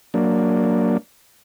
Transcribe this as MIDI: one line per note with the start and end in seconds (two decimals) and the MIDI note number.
0.14 0.97 54
0.14 0.97 58
0.14 0.97 62